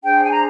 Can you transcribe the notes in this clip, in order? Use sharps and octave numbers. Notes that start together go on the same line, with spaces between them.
D4 G#4 C5 G5
G#5
A#5